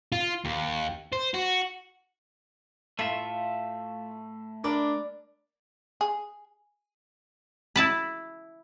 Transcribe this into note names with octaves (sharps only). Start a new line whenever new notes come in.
F4
D#2
C5
F#4
A2 A3 F4 E5
D4 A#4 D5 B5 D6
G#4
E4 A5 B5